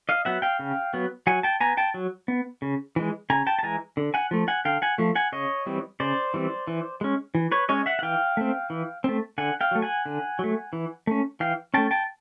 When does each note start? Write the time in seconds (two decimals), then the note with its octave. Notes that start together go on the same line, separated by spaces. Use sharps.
0.09 D#5 F5
0.25 F#3 B3 E5 F#5
0.42 F5 G5
0.59 C#3
0.94 F#3 B3
1.27 F#3 F#5 G#5
1.43 G5 A5
1.61 B3 G#5 A#5
1.77 G5 A5
1.94 F#3
2.28 B3
2.62 C#3
2.96 E3 G#3
3.30 C#3 G#5 A#5
3.47 G5 A5
3.59 A5
3.63 E3 G#3 G#5 A#5
3.97 D3
4.14 F#5 G#5
4.31 F3 A3
4.48 F#5 G#5
4.65 D3 F5 G5
4.82 F#5 G#5
4.98 F3 A3
5.15 F#5 G#5
5.32 C#3 C#5 D#5
5.66 E3 G3 C4
6.00 C#3 C5 D5
6.34 E3 G3 C4
6.67 E3
7.01 G#3 C#4
7.35 E3
7.52 B4 C#5
7.69 G#3 C#4 C#5 D#5
7.86 E5 F#5
7.99 F#5
8.02 E3 F5 G5
8.37 A3 C4
8.70 E3
9.04 A3 C4
9.38 D3 F#5 G#5
9.61 F5 G5
9.71 F#3 A3
9.82 F#5 G#5
10.06 D3
10.39 F#3 A3
10.73 E3
11.07 A3 C#4
11.40 E3 F5 G5
11.74 A3 C#4 G5 A5
11.91 G5 A5